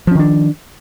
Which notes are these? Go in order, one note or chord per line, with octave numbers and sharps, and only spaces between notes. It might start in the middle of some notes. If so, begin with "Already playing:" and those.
D#3 F3 C#4 D4